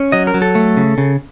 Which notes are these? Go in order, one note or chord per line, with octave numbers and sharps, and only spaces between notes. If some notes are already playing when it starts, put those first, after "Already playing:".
Already playing: C#4
F#3 D#5
A#4
F#3
A4
A3
C#3
C#3